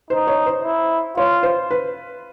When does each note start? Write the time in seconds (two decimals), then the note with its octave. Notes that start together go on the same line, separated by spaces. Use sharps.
0.10 D#4 C5
0.27 C#5
0.46 C5
0.63 E4
1.17 F4 C#5
1.43 C5
1.71 B4